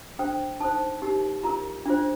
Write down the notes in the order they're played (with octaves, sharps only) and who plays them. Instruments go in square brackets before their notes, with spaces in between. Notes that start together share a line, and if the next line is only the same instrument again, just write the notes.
[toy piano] D4 A4 C5 G5
D#4 A4 C5 A5
D#4 G4 A#4
F4 A#4 A#5
D4 F4 C5